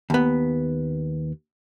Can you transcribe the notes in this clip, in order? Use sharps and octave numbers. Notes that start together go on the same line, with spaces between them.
D#2 B3